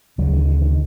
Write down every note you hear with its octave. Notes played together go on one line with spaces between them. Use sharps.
D2 C#3 F#3
D#3
D3
D#3